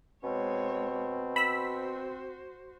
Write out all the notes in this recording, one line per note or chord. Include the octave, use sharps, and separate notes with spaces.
B2 G#3 C4 C#5
F#4 C5 B5 E6 B6